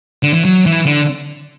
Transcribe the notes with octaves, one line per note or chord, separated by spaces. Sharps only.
D3
E3
F#3
E3
D3